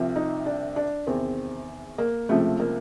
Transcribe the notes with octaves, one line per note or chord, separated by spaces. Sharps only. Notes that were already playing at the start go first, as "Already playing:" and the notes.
Already playing: C2 C3 F3
D#4
D4
D4
E2 C3 D#3 C4
A#3
C#2 C3 F3 A3
A#3